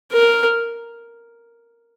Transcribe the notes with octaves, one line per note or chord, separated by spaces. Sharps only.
A#4